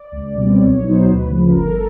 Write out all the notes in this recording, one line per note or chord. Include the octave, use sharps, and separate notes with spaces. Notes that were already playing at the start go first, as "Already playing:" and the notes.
Already playing: D5
C#2
B2 G3 C4
B1 C#5
C#5
B2 F#3 B3 D#4
C5
D2 B4
C#3 F3
G1 A#4
A4